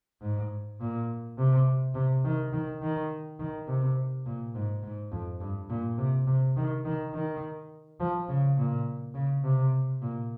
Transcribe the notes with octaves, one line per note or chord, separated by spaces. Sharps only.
G#2
A#2
C3
C3
D#3
D#3
D#3
D#3
C3
A#2
G#2
G#2
F2
G2
A#2
C3
C3
D#3
D#3
D#3
F3
C#3
A#2
C#3
C3
A#2